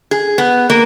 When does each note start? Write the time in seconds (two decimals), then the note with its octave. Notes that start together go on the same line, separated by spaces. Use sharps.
0.11 G#4
0.38 B3
0.70 A#3